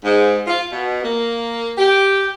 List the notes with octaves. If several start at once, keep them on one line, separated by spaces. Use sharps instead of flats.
G#2
F4
B2
A#3
G4